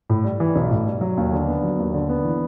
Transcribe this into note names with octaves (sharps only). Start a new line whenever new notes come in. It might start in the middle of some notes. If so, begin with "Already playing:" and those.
A2
G3
E3
B1
A2
G3
F#3
D#2
D3
B3
F#3
D#2
D3
B3
E3